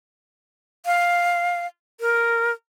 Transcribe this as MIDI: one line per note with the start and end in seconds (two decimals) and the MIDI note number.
0.86 1.67 77
2.00 2.52 70